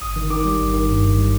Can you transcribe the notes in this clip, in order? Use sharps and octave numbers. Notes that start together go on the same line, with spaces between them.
G1 D#6
D#3
D#3 D6
G3
G1
D#3
G2
G1
G3